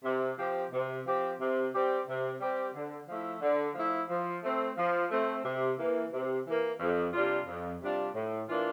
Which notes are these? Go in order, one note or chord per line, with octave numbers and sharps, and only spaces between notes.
C3
F3 C4 G4
C3
F3 C4 G4
C3
G3 C4 G4
C3
G3 C4 G4
D3
F3 A3 E4
D3
F3 A3 E4
F3
A3 C4
F3
A3 C4
C3
E3 A#3
C3
E3 A#3
F2
C3 G3 D4 F4
F2
C3 G3 D4 F4
A2
E3 A#3 D4 F4